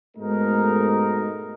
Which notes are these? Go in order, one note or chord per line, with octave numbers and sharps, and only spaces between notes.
G#2 B2 A3 D#4 A#4